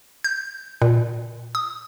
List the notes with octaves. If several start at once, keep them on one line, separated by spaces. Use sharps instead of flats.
G6
A#2
D#6